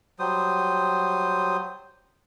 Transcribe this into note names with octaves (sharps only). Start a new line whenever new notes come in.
F#3 G3 C5 D#6